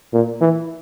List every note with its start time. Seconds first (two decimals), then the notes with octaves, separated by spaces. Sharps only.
0.13 A#2
0.41 E3